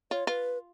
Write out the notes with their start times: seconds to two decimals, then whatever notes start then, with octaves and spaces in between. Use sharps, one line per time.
0.11 F4 C#5
0.27 F4 B4